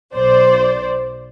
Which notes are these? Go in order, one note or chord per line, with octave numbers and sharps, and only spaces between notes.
B1 C5 D5